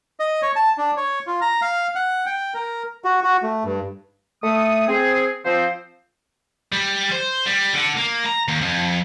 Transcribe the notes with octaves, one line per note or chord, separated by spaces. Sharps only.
D#5
C#5
A5
D4
C#5
F4
A#5
F5
F#5
G5
A#4
F#4
F#4
A3
G2
A3 D#6
C4 G#4
F3 C4 C5
G3
C5
G3
D3
A#3
A#5
D#2
F2